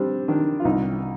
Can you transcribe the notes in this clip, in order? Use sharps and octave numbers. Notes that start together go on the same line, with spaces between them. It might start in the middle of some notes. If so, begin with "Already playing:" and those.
Already playing: G3 C4 D4
D#3 D4
F4
C2 D#4